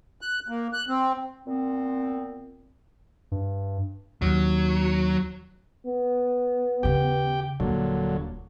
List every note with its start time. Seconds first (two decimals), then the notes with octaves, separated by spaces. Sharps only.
0.21 F#6
0.48 A#3
0.73 F#6
0.88 C4
1.46 A#2 B3 C4
3.32 G2
4.22 D#2 F#3
5.86 B3
6.83 D#2 C#3 G4 G5
7.60 D#1 A#2 D3 F#3